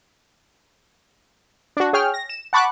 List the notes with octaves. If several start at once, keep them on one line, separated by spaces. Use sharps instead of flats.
D4 F#4
G#4 C#5 G5 F6
A#6
E7
F#5 A5 B5 C#6 D6 F#6